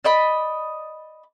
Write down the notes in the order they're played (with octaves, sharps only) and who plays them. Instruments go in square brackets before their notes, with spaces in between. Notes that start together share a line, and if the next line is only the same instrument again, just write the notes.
[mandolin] D5 D#5 B5